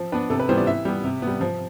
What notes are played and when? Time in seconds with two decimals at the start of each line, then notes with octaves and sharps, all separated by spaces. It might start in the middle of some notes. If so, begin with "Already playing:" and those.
Already playing: F3
0.12 B3 D4 B4
0.30 C3 A4
0.40 B4
0.49 E3 G3 B3 C5
0.58 D5
0.67 E3 E5
0.85 G3 B3
1.04 C3
1.22 G3 B3
1.41 F3